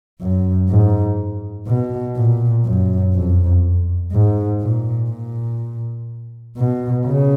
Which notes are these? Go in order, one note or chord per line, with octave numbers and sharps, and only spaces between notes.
F#2
G#2
B2
A#2
F#2
F2
G#2
A#2
A#2
B2
C#3